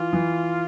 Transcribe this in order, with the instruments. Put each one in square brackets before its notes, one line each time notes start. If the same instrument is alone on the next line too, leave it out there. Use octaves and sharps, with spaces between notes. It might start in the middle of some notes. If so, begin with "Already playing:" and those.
Already playing: [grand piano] E3 [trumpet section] F4
[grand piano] E3